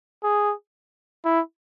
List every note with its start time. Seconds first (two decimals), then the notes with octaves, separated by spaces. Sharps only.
0.23 G#4
1.25 E4